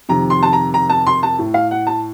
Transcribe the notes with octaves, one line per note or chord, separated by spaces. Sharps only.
F2 C3 D#3 A#5
C6
A5
A#5
A#5
A5
C6
A5
A2
F5
F#5
A5